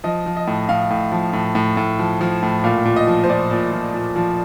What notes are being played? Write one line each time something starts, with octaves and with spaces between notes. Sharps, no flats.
F3 D#5
F3
D#5
A2
A2 F5
A2
F3
A2
A2
A2
F3
F3
A2
A#2 F5
A#2
D#5
F3
C5
A#2 D5
A#2
F3
A#2
F3